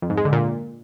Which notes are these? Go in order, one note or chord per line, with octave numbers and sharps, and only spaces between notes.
F2
G#2
G#3
D3
A#2